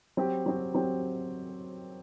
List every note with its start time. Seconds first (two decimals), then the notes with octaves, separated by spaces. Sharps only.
0.17 F#3 C4 G4
0.46 F#3 C4 G4
0.75 F#3 C4 G4